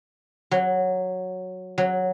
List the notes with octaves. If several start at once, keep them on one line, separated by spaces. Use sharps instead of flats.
F#3
F#3